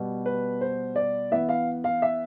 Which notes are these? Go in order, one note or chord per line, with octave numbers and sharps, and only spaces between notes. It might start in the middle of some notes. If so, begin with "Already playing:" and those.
Already playing: B2 G3 B3
B4
C5
D5
E3 B3 E5
F5
F5
E5